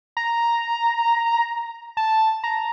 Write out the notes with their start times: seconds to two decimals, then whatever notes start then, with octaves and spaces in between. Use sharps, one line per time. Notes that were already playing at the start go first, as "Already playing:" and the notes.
0.17 A#5
1.97 A5
2.44 A#5